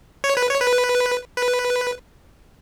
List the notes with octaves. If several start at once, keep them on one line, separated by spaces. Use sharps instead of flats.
C#5
B4
C#5
B4
B4